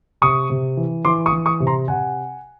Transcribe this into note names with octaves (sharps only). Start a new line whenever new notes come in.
C3 C#6 D#6
C3
E3
E3 C6 D6
C#6 D#6
E3
C#6 D#6
C3
A#5 C6
C3 F#5 G#5